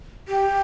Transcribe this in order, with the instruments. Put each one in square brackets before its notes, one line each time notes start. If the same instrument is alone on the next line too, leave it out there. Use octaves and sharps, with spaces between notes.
[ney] G4